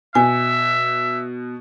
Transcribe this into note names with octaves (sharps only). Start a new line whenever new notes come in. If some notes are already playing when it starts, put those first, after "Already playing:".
B2 E5 G#5